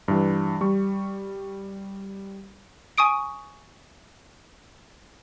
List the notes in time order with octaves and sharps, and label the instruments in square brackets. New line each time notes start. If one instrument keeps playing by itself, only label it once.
[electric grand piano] G2 E3
G3 C#6
[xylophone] G#5 C#6 D#6 D7